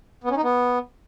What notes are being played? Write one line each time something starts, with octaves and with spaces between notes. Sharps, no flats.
B3
C#4
D#4
B3